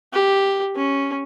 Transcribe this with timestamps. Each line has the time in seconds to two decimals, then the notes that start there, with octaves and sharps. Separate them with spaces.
0.13 G4
0.75 C#4